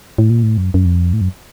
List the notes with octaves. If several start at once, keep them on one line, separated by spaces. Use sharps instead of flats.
A2
A#2
A2
F#2
F#2
F2
A2
F#2